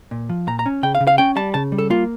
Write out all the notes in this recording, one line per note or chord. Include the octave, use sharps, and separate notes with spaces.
A#2
F3
A#2 A#5
A#5
C#4
C#3 G5
F5
C#3
F5
C#4 G5
G3 A5
C#3 A5
G3
A4
A#3 F4